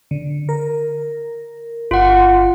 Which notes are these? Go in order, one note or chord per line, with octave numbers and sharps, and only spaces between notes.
D3
A#4
G1 F4 F#5 C6